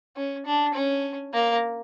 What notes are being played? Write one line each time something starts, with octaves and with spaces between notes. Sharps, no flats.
C#4
D4
C#4
A#3